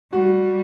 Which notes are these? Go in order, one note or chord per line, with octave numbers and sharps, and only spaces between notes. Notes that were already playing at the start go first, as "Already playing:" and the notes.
G3 F#4